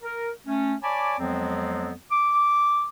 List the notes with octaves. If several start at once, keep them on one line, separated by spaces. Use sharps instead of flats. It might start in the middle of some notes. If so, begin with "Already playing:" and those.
A#4
A3 C#4
C#5 D5 G#5 A5 B5 D6
F2 F3 F#3 G#3 B3 C4
D6